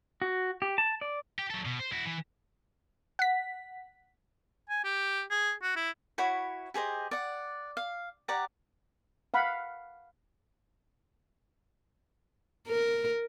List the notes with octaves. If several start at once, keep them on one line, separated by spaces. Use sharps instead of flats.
F#4
G4
A5
D5
G4
F#3 A4
B2
C5
E4 F#4
E3
F#5 B6
G#5
G4
G#4
F#4
E4
E4 F#4 C#5 B5
G4 G#4 C5 D#5
D5 F#5
F5
G4 D5 F#5 A#5
F5 F#5 B5
A#4